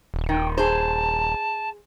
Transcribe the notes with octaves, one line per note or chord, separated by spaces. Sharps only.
D#1
D#3 G5
G#4 C5 A5